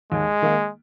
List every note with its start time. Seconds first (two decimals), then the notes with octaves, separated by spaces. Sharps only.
0.12 D#2 G#3
0.42 D#3 A#3 D#4